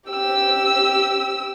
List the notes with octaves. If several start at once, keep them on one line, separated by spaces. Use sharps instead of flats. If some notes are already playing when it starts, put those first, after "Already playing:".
G4 E6